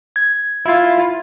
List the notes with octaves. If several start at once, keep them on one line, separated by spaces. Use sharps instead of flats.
G#6
E4 F4